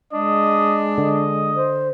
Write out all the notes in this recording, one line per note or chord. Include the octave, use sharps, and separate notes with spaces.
G#3 D4 D#5
D3 D#5
C5